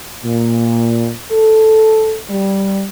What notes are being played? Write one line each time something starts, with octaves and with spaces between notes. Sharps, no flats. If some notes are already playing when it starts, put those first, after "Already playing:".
A#2
A4
G3